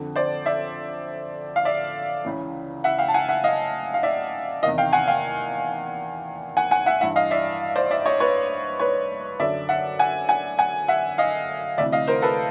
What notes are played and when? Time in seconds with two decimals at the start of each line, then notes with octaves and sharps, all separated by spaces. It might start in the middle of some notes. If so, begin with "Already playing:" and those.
Already playing: F2 D3
0.16 C5 D5
0.46 D5 E5
1.56 F5
1.65 D5 E5
2.25 C#2 C#3 E3
2.84 E5 F#5
2.99 F5 G5
3.08 A5
3.14 F#5 G#5
3.29 E5 F#5
3.44 D#5 F5
3.94 F5
4.03 D5 E5
4.63 E2 C3 D#3 D#5 F5
4.78 F5 G5
4.93 F#5 G#5
5.08 F5 G5
6.57 F#5 G#5
6.71 F#5 G#5
6.86 E5 F#5
7.01 G2 E3 E5 F#5
7.16 D#5 F5
7.31 D5 E5
7.76 C5 D5
7.91 D5 E5
8.06 C#5 D#5
8.20 B4 C#5
8.79 B4 C#5
9.40 F#2 D3 D5 E5
9.69 E5 F#5
9.99 F#5 G#5
10.29 F#5 G#5
10.59 F#5 G#5
10.88 E5 F#5
11.18 D#5 F5
11.78 D2 C3 E3 D5 E5
11.92 D#5 F5
12.07 A#4 C5
12.22 A4 B4